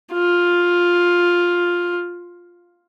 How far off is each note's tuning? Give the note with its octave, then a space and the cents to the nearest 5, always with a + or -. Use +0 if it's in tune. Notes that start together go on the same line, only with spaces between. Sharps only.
F4 +10